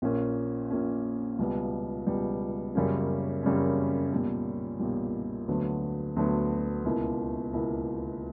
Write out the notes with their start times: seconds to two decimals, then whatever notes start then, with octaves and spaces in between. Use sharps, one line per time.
0.02 A#1 A#2 A#3 C#4
0.70 A#1 A#2 A#3 C#4
1.39 C#2 B2 G3 B3
2.06 C#2 B2 G3 B3
2.75 F#2 C#3 G3 A#3 C#4
3.43 F#2 C#3 G3 A#3 C#4
4.12 B1 A#2 G3
4.80 B1 A#2 G3
5.48 D2 D3 F#3 B3
6.16 D2 D3 F#3 B3
6.85 C#2 B2 A#3 E4
7.53 C#2 B2 A#3 E4